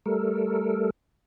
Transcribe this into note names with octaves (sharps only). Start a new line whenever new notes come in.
G3 A3 A4 A#4